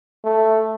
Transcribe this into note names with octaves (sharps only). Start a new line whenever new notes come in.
A3